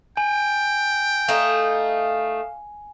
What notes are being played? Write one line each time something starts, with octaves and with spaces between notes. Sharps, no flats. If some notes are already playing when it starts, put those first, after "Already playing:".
G5 G#5
A3 D#4 F5